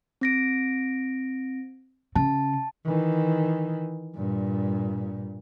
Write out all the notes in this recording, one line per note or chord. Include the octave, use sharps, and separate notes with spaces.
C4 A#6 D7
C#3 A5
D#3 E3
G2 A#2